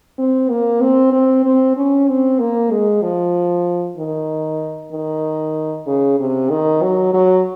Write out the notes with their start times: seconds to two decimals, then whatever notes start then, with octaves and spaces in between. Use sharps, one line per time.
0.18 C4
0.50 A#3
0.82 C4
1.12 C4
1.44 C4
1.76 C#4
2.08 C4
2.39 A#3
2.71 G#3
3.03 F3
3.98 D#3
4.92 D#3
5.87 C#3
6.20 C3
6.50 D#3
6.82 F#3
7.13 F#3